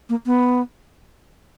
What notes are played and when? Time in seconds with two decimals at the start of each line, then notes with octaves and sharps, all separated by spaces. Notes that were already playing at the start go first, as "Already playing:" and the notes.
0.09 A#3
0.26 B3